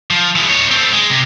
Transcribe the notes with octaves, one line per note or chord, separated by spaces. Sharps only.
F3
E3 G#3
D#4 C#5
A3 C4
G#3
C3